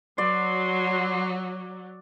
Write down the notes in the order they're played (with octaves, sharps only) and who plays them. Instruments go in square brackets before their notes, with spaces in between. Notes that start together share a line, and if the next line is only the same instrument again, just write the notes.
[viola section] F#3 [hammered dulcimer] D5 [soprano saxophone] C6